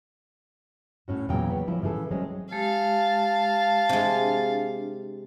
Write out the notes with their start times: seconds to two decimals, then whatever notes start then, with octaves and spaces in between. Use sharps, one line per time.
1.08 A2 C#4 F#4
1.29 E2 A#2 C#3 E3 F#3 G5
1.50 B3 C#5
1.67 F3 G#3 E4 F4
1.82 A2 C#3 E3 G#4 A4
2.11 F#3 G#3 C4 C#4
2.52 G#3 G4 F5 A5
3.89 C3 G#3 D4